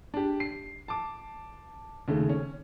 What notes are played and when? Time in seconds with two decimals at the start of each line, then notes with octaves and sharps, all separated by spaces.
0.14 D4 G4
0.40 C7
0.88 A5 D6
2.08 D#2 C#3 A3
2.29 C#4